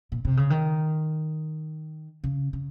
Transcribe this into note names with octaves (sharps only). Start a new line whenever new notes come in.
A#2
C3
C#3
D#3
C#3
C#3